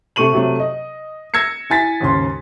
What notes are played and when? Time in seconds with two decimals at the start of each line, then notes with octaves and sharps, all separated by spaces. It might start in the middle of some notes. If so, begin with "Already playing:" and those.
0.16 C3 A3 A4 C#6 D#7 F#7
0.33 C3 F#3 A3
0.60 D#5
1.34 E6 G#6 A#6 C#7
1.70 E4 G#5 A6 B6
2.01 D#2 G#2 C#3 C6